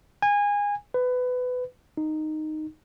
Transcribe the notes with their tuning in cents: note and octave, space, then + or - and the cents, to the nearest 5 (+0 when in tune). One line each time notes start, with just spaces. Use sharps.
G#5 -25
B4 +20
D#4 -10